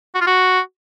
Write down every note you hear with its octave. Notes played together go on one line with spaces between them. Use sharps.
F#4
F4
F#4